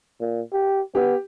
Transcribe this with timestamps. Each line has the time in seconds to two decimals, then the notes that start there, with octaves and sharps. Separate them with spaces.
0.20 A#2
0.53 G4
0.95 B3 G4